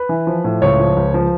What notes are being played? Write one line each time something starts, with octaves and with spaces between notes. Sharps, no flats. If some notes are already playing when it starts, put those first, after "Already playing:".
Already playing: B4
E3
F3
A2
C#2 C#5
F3
C#2
F3